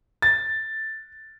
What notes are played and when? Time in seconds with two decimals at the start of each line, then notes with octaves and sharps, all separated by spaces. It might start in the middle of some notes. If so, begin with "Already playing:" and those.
0.22 A6